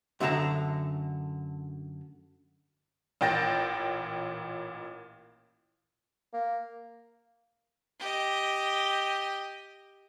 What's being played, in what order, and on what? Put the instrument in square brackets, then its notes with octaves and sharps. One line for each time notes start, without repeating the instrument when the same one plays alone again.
[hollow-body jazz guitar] F#2 D3 A3 A4 A5 A#5
[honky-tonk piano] A1 A#2 G5 A6 A#6
[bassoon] A#3
[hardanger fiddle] G4 D#5